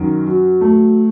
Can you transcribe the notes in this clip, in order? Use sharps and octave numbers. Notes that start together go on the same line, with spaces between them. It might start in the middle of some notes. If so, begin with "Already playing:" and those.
Already playing: F#2 D#3
F#3
A3